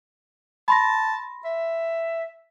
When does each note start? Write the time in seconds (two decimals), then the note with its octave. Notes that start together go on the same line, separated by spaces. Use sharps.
0.68 A5 B5 C6 A#6
1.45 E5